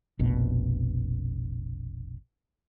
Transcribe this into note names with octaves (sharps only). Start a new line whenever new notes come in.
F1 A#1 B2